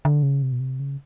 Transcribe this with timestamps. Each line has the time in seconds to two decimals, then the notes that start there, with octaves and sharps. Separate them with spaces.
0.05 D3
0.23 C#3
0.42 C3
0.52 B2
0.60 C3
0.80 C#3